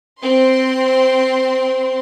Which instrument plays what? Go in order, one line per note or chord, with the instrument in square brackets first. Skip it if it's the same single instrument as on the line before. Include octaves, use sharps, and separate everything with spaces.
[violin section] C4 C6